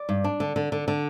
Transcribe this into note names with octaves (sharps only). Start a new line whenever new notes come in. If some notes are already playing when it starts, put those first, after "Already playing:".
Already playing: D5
G2
D4
D3
D3
D3
D3